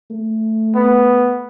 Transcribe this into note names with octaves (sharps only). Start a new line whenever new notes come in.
A3
B3